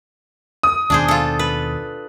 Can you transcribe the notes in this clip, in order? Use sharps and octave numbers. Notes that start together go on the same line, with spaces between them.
D#6
D#2 B2 D4 G#4 C5
F4 A4
B4